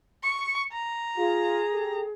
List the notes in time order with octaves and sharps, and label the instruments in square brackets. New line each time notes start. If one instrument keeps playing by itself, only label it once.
[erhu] C#6
A#5
[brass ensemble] F4 [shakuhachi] G#4
[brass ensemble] G4 A4